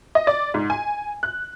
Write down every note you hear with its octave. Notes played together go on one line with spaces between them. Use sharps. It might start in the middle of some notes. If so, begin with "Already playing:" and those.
D#5
D5
G#2
G#5
F#6